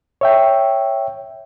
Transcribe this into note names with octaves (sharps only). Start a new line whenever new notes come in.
C#5 E5 G5